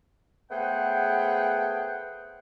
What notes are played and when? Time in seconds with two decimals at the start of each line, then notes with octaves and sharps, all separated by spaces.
0.50 A3 B3 G#4 C5 F#5 G5